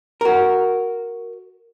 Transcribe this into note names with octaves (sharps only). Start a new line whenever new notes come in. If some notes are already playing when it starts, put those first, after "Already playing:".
F#4 A#4